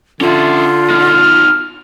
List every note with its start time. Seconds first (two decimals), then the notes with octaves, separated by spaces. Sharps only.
0.21 D3 C#4 F4 E5
0.90 D#4 F#4 F6